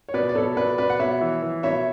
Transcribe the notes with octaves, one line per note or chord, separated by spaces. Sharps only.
C#5
B2 B4 D5
D5
B2 A4 C#5
B2 B4 D5
B2 B4 D5
F#5
B2 C#5 E5
E3
E3
B2 C#5 E5